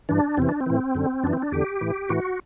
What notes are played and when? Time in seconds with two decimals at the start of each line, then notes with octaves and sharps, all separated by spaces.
0.09 G2 E3 D4
0.37 E2 C3 E3 C4
0.49 D4
0.61 C4
0.66 A2 E3
0.95 F#2 D3
1.24 F#2 E3 D4
1.33 C4
1.42 D4
1.52 E2 D3 G4
1.81 A2 E3
2.09 A2 E3 F#4